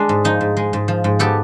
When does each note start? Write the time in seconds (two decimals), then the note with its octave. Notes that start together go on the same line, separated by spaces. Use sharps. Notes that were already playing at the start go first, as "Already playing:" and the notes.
Already playing: G#3 D4
0.09 G#2
0.24 F3 D#4
0.41 G#2
0.57 G#3
0.73 G#2
0.88 F3
1.04 G#2
1.19 B3 G4 A4